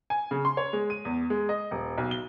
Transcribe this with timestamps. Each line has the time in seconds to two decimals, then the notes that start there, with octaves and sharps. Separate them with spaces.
0.10 G#5
0.31 C#3
0.45 C6
0.57 C#5
0.73 G#3
0.90 D#7
1.05 E2
1.30 G#3
1.49 D#5
1.71 D#1
1.98 B1
2.11 G7